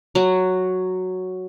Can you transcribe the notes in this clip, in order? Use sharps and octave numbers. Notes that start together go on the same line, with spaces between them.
F#3 F#4